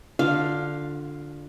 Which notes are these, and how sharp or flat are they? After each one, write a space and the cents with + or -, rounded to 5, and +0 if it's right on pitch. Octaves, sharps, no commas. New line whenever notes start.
D3 +0 F4 +20 F5 +0